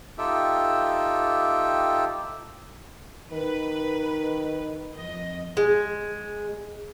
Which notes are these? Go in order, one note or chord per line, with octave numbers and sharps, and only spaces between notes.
D#4 F4 G4 A4 E5 G5
D#3 B4
F2 D#5
G#3